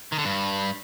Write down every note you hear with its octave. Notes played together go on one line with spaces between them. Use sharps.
D#3
D3
G2